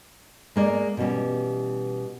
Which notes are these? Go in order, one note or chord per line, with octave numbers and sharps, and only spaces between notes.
G#3 A#3 D5
B2 E3 G3 C#4 G4